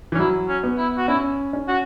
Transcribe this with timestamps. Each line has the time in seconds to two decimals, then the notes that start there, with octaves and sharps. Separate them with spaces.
0.12 E3
0.15 C#4
0.19 F#3 E4
0.48 C#4
0.63 B3
0.78 E4
0.97 F#4
1.08 C#4 E4
1.53 C#4
1.68 F#4